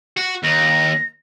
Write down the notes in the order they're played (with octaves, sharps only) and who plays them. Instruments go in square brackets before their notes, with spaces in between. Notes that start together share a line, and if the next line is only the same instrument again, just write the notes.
[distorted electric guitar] F#4
[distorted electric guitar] D#2 [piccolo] A#6